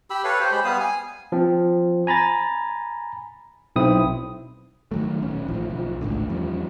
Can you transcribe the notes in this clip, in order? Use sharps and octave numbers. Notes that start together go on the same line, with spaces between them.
G4 B5 E6
A4 B4 C#5 F5
G4 C5
G#3 C5 B5
G3 B3 F5 D#6
G#5
F3 C4
G#5 A#5 B5 A6
B1 C4 E4 D#6
D#3 F#3 A3
D#1 B1 C#4
A1 D#2 E3 F3
B1 F3
G#1 C#2 A2 D3
E2 F3 G3 C#4